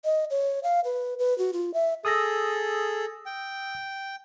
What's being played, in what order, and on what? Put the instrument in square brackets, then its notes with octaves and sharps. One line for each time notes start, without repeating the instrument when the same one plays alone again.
[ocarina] D#5
C#5
F5
B4
B4
F#4
F4
E5
[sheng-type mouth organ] G#4 A4 [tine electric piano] D#6 E6 A#6
[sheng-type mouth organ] G5